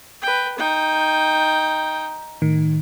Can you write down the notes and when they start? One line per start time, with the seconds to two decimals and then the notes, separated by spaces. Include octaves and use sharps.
0.22 B4 G5
0.58 D#4 G5
2.42 A2 D#3